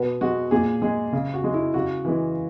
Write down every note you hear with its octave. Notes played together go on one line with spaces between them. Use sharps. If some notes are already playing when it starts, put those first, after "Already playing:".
Already playing: B2 B3
G#3 F#4
A#2 G#4
G#3 G#4
C#3
F#4
G#3
E4
C#3 F#4
E3 G#3